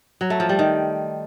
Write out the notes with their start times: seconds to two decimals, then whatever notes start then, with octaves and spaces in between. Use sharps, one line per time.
0.21 F#3
0.30 A3
0.40 F3
0.49 G3
0.59 D#3